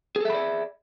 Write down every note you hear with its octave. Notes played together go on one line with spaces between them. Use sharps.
G#4 A4 D5 E5 B5